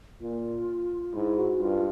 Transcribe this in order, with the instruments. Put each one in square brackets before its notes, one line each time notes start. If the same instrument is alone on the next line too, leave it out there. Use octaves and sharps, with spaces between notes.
[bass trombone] A#2 [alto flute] F4
[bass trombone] G#2 [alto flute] E4
[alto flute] F#4
[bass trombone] G2 [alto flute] F4